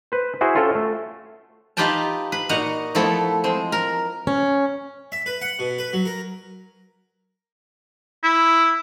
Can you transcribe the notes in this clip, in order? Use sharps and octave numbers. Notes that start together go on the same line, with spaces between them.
B4 C5
E4 F#4 G#4 C5
C#4 F4 F#4 A4 C5 G5
A3
D#4 F4 G4 B4 G5 A5
B4
A#2 D#4 F#4 D#5 F#5 A#5
F3 A3 B3 E4 A4
G#3 C4
A#4
C#4
E5
B4
F#5
B2
B4
F#3
A#4
E4